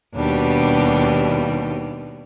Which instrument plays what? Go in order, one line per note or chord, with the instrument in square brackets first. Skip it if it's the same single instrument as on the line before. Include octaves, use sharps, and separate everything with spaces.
[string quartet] D#2 B2 G3 D4